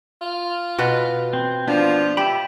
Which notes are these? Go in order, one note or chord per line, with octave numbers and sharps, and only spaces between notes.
F4
B2 F#4 B4
C4
F3 B3 D4 F4
G4 E5 B5